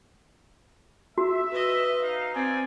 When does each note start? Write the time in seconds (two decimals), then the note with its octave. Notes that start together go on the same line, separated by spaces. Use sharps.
1.18 F#4 E5
1.51 B4 D#5
2.02 D#4 F5
2.35 C4 C5 D5 G#5